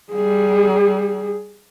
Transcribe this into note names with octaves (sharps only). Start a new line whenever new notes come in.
G3 G#4